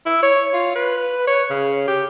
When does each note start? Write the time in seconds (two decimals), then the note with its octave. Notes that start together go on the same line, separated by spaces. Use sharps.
0.06 E4
0.23 C#5
0.53 F4
0.75 B4
1.27 C#5
1.50 C#3
1.87 G4